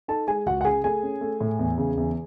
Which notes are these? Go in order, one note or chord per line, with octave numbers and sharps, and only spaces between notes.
D#4 A4 A5
G#3 G#4 G#5
C#2 F#4 F#5
F#5
C#3 G#4 G#5
A3 G#4 G#5
C#4
A3
A2
E2
C#3
E2